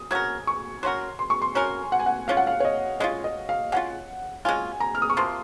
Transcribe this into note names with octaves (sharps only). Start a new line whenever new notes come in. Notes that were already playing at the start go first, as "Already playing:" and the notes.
Already playing: D#6
F#3 C#4 F#4 A#4 G#6
C#6
F#3 C#4 F#4 A#4 C6
C6
C#6
C6
F#3 C#4 F#4 A#4 G#5
F#5
G#5
F#5
G#3 C#4 F4 F5
F#5
F5
C#5
D#5
G#3 C#4 F4 D#5
D#5
F5
G#3 C#4 F4 F#5
G#3 C#4 F4 G#5
A#5
F6
D#6
C#6
C3 F3 A#3 C6